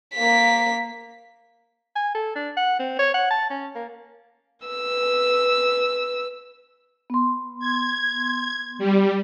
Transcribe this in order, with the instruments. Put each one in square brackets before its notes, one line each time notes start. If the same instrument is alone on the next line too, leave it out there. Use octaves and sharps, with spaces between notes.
[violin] A#3 B6
[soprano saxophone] G#5
A4
D4
F#5
C4
C#5
F#5
A5
C#4
A#3
[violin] B4 E6
[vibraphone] B3 C6
[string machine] G#6
G3